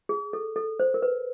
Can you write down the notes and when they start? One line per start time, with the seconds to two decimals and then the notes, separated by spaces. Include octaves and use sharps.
0.09 G#4
0.33 A4
0.56 A4
0.80 C5
0.94 A#4
1.02 B4